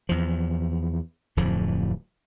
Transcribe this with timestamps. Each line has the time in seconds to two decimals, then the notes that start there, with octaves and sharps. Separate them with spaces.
0.09 E2 F3
1.37 D1 F2 A2 F3